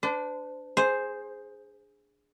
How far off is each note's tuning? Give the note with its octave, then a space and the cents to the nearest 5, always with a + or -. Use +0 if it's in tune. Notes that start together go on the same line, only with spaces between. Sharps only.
D4 +0 C5 -45
G#4 +0 C5 +0